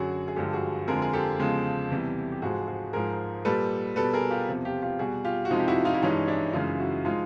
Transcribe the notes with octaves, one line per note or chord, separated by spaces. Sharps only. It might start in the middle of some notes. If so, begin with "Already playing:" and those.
Already playing: F#2 D3 F#3 F#4 G#4
G#4
G2 D3 F3 G#3 G4 A4
F#4 G#4
F2 D3 F3 G#3 G#4 A#4
G#4
G4 A4
E2 C#3 F3 G#3
E2 C3 E3 G3
G4
G#2 F3 G#3 F#4 G#4
F#4 G#4
G#2 F3 G#3 G#4 A#4
A#2 G3 A4 B4
B2 G3 A4 B4
G#4 A#4
F4 G4
E2 C3 F3
F4 G4
F4 G4
B2 G3 F#4 G#4
F4 G4
F#4
F2 C3 F3 G#3 D#4 F4
G4
E4 F#4
D#4 F4
E4
G2 E3 G#3 C#4 D#4
D4 E4
F#2 C#3 E3 G#3 D#4 F4
E4 F#4
F3 G#3 D#4 F4